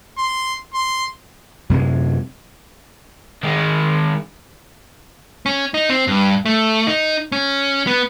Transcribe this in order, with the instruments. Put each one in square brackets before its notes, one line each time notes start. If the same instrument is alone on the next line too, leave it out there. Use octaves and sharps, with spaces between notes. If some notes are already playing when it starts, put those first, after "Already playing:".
[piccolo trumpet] C6
C6
[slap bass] F#2 C3 G#3
[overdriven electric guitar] D#3 G#3
[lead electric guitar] C#4
D#4
C4
G2
A3
D#4
C#4
B3